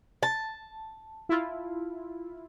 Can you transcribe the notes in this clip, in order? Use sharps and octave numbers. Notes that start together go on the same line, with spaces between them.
A5
E4 F4